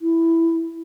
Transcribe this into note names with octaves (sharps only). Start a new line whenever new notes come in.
E4